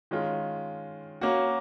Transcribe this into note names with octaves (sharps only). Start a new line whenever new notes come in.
D#3 G#3 C#4 F4
A#3 C#4 F#4